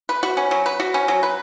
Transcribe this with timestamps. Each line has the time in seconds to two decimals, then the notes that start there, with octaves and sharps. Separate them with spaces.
0.09 B4
0.23 F#4
0.37 C#4
0.51 F#3
0.66 B4
0.80 F#4
0.94 C#4
1.08 F#3
1.23 B4